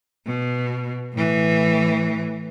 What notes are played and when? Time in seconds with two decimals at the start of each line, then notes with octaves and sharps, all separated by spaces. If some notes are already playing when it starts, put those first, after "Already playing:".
0.26 B2
1.13 A2 E3